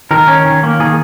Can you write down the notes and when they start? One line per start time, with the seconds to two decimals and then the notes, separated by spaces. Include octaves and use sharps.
0.11 D#3 A#4
0.28 C#4
0.45 D#3
0.63 A#3
0.80 D#3 G#4